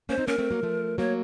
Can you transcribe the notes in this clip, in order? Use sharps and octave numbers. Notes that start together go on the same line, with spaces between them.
A#3 C#4 C5
C4 D#4
A#3 C#4 A#4
A3 C4
F#3 A#3
F3 A3
F#3 A#3 C#5